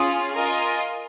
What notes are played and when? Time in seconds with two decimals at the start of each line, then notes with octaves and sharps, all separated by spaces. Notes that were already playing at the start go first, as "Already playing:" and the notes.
Already playing: C#4 F4 G#4 D#6
0.36 F4 A#4 D#5 G#5